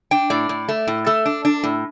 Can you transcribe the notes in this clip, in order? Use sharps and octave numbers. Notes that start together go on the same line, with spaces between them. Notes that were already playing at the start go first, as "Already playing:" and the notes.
D4 G5
A2 D5
A2
A3
A2
A3 A4
D4
D4
A2